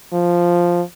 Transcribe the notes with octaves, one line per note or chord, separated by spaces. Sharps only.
F3